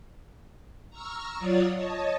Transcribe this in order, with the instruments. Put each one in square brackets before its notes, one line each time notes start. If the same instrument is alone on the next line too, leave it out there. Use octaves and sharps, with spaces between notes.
[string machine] A#5 C#6 E6 F6
F#3 F4 C#5 D5 D#6 A6
C#5 D#5 A5